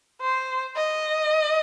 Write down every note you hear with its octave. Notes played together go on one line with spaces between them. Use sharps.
C5
D#5